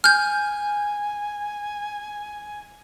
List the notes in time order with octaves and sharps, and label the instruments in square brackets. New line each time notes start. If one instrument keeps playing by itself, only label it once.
[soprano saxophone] G#5 [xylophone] F6 G6